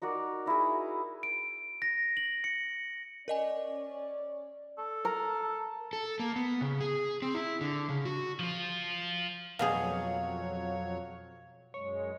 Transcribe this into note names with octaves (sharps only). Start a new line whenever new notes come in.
D#4 F#4 A#4 D5
D#4 E4 F#4 G#4
D7
A#6
F#7
C#7
C#4 A#4 D5 D#5 G#5
A4
A#4
A4
A#3
B3
C#3
G#4
C4
E4
D3
C#3
F#4
F3 F4
F2 B2 F#3 G3 G#4 C#5 F5
F#2 G#3 C#5